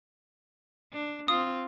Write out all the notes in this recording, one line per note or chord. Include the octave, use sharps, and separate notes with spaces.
D4
C4 F4 D#6